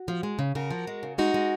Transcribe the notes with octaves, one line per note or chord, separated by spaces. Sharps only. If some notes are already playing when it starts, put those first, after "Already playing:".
Already playing: F#4
F3
G#3
C#3
C#3 F#4 A#4
F3
G#3
C#3
G#3 D#4 F#4
G#3